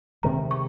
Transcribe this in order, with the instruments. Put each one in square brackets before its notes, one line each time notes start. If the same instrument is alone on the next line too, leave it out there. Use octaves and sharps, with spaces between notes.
[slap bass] C3 D#3 G#3 [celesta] A#5
[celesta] C#6